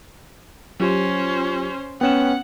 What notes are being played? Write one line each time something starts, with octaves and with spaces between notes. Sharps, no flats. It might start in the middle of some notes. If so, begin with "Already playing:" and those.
F#3 C#4 F4 G4 C5
B3 C#4 F#5 G5 E7